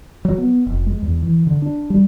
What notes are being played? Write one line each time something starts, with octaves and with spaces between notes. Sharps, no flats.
F#3
B3
F1
G#3
E2
E3
D3
D4
G3